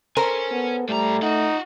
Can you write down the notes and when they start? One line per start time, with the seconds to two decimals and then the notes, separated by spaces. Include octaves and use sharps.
0.17 A4 A#4 C5 C#5 G#5
0.52 B3
0.89 A2 G3 A3 A#5
1.22 D#4 F4 F#5